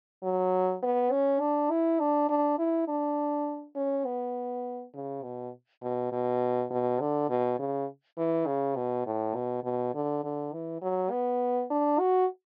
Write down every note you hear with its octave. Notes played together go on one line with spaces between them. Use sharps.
F#3
B3
C#4
D4
E4
D4
D4
E4
D4
C#4
B3
C#3
B2
B2
B2
B2
D3
B2
C#3
E3
C#3
B2
A2
B2
B2
D3
D3
E3
F#3
B3
D4
F#4